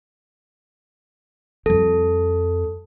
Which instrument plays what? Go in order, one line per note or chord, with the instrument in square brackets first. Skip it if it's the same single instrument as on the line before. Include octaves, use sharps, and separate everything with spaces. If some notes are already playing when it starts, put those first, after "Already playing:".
[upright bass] F2 G3 [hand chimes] A4